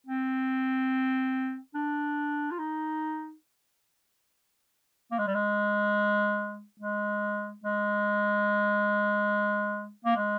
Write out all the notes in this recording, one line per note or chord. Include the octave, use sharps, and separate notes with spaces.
C4
D4
F4
D#4
A#3
G#3
G3
G#3
G#3
G#3
A#3
G#3